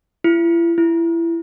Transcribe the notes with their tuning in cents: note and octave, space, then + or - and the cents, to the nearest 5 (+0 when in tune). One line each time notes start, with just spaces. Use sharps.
E4 +40
E4 +25